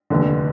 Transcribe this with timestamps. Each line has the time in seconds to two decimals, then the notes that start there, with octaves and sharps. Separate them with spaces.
0.10 F1 D#2 D3